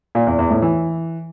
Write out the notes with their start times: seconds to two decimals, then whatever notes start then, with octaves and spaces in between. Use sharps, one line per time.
0.15 A#2
0.27 E2
0.39 E2
0.50 A2
0.62 E3